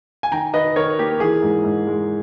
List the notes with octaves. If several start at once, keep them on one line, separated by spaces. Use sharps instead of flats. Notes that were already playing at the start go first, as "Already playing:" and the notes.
G#5
D#3 G5 A#5
D#3 B4 D#5
D#3 A#4 C#5
A#3 G4
E3 G#4
G#2
G#2
G#3